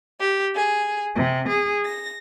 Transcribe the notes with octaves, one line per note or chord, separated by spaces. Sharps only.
G4
G#4
C3
G#4
A#6